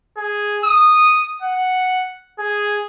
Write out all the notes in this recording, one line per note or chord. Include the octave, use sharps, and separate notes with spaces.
G#4
D#6
F#5
G#4